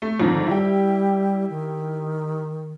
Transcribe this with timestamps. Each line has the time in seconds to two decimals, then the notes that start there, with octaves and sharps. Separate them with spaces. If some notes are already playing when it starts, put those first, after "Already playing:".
0.02 A3
0.20 F2 G#2 D3 D#3
0.47 G3 E4 G4
1.50 D#3